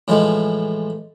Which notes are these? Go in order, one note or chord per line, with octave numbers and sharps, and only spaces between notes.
A2 E3 F3 G#3